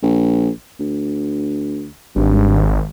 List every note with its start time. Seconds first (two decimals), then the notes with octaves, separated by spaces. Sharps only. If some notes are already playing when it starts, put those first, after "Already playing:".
0.03 A#1
0.80 D2
2.16 G#1 G2